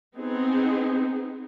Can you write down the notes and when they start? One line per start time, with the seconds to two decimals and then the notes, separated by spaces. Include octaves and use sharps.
0.15 B3 C4 D#4 G#4